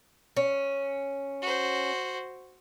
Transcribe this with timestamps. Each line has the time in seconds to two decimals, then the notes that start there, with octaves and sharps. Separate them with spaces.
0.37 C#4
1.42 F#4 C5